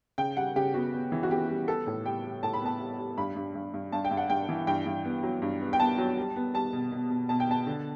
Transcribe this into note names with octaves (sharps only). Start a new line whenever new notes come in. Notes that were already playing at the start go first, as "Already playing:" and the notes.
C#3 G5
G3 F#5
C#3 G4
B3 F#4
B3
E3
F#4
B3 G4
G3
B3 A4
A2
G3 G5
G3
A2 A5
B5
B3 A5
G3
G3
G2 B5
G2
G2
G2
G2 A5
G5
G2
F#5
G2 G5
E3
G2 G5
G2
B3
F#3
G2
B3
G5
B3 A5
F#3
G3
B3
G3 A5
B2
B2
B2
B2 A5
G5
B3 A5
D3